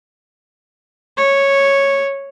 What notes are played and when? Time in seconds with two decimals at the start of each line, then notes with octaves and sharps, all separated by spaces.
1.17 C#5